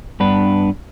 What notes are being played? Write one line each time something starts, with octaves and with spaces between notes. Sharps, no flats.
G2 B3 D4 B4